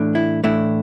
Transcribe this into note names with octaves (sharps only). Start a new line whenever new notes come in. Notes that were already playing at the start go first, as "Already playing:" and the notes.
Already playing: A2 E3 A3 D4
E4
A2 E3 A3 D4 E4